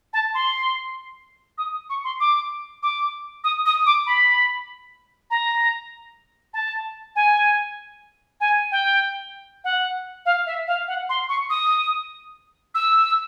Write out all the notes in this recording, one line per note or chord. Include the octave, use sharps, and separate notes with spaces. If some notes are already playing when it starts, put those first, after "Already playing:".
A5
C6
D#6
C#6
C6
D6
D6
D#6
D#6
D6
B5
A#5
A5
G#5
G#5
G5
F#5
F5
E5
F5
F#5
C6
C#6
D#6
E6